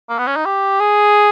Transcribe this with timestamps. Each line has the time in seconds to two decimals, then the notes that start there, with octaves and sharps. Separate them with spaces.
0.09 A#3
0.19 B3
0.27 C#4
0.36 D#4
0.46 G4
0.80 G#4